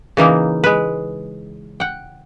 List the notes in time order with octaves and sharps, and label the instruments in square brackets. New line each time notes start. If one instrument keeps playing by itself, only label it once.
[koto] C#3 E3 A#3 D#4
G#3 B4
F#5 G5